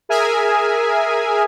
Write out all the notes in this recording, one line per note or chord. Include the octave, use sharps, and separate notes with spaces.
G#4 A#4 E5 G#5